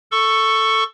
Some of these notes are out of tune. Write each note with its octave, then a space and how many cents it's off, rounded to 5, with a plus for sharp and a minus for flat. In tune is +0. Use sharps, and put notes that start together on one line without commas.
A4 +10 C#6 +0